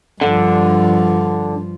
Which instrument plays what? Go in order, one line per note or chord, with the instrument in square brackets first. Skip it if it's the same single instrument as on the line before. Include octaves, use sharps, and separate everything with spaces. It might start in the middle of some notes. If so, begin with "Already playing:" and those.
[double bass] G2 F3 [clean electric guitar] D3